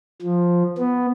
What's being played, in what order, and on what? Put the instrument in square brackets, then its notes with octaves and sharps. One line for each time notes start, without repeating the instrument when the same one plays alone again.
[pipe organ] F3
B3